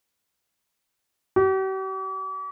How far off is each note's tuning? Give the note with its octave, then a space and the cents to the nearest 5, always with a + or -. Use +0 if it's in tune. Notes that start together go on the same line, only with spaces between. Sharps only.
G4 -45